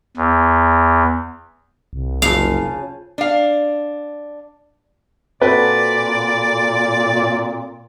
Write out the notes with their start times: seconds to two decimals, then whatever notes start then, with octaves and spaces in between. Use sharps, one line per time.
0.17 E2
1.93 C2
2.22 F#1 C#3 F3 F5
3.18 D4 F5
5.42 A#2 C4 F#4 A4 B4 D5